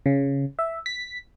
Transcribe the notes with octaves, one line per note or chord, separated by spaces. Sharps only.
C#3
E5
B6